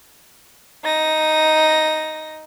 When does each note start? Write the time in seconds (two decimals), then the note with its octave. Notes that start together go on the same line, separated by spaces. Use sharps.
0.84 D#4 A#6